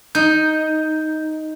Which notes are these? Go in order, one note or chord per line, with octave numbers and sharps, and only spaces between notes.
D#4 G6